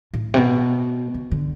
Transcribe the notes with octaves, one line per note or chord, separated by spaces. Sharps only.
A2
C3
B2
C#3
D3